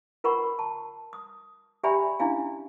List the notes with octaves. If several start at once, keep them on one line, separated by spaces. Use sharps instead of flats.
F4 A#4 F#5 B5 C#6
A5
D#6
G4 D5 E5 G5 G#5 B5
C#4 D4 E4 F5 G#5